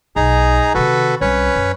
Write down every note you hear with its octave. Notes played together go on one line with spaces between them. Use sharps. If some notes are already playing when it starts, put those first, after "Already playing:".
B1 D#4 G#4 A#5
C3 D#3 F#4 A4 B4
C2 C#4 B4 C#5
F#2